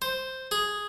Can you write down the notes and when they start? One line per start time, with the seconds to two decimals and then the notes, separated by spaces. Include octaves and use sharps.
0.02 C5
0.51 G#4